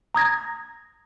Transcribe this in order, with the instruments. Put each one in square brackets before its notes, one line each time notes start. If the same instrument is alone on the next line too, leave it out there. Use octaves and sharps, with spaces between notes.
[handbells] A#5 D#6 G#6 A#6